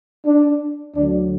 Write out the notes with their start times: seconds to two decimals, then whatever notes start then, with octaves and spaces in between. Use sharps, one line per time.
0.26 D4
0.96 D2 D3 F#3 D4